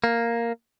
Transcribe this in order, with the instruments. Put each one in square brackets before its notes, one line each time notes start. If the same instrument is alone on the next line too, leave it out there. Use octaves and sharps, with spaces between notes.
[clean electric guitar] A#3